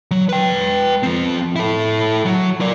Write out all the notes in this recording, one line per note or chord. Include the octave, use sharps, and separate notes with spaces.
F#3
B4 G5
F3 C4
E4 A4
F#3
A#4 D5